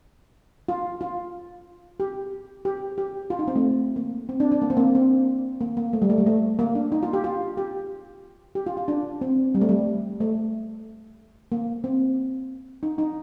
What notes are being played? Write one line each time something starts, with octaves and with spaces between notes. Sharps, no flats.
F4
F4
G4
G4
G4
F4
D#4
C4
A3
A#3
C4
D4
D4
A#3
C4
A#3
C4
A#3
A#3
A3
G3
A3
G3
A3
A#3
D4
D#4
F4
G4
F4
G4
G4
F4
F4
D4
C4
G3
A3
G3
A3
A#3
C4
D#4
D#4